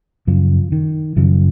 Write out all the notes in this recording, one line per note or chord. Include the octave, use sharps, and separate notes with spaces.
F#2 C#3 F3
D#3
F#2 C#3 F3